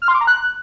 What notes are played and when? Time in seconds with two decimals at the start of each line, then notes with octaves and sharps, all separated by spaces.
0.02 F6
0.08 C6
0.15 D6
0.21 A#5
0.27 F#6